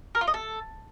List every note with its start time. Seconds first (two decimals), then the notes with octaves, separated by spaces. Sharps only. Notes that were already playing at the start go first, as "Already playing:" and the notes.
0.15 A#4
0.21 F4
0.27 D#5
0.34 A4